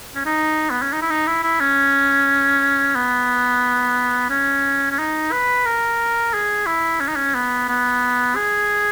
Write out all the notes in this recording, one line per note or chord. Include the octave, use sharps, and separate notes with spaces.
C#4
D#4
B3
C#4
D#4
E4
D#4
E4
E4
C#4
B3
C#4
C#4
D#4
B4
A#4
G#4
E4
C#4
D#4
C#4
B3
B3
G#4